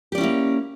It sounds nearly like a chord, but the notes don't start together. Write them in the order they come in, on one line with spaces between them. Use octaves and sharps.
G4 D5 C#4 E4 A#3